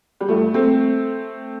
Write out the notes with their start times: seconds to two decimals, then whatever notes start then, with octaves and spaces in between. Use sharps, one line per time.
0.21 G3
0.28 G2 F3 A3
0.54 A3 C4